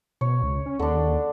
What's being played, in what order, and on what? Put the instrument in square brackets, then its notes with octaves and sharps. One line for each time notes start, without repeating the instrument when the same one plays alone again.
[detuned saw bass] B2 [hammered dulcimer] C#5
[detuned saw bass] C#2
C#4
[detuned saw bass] D#2 [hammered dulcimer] D3 D4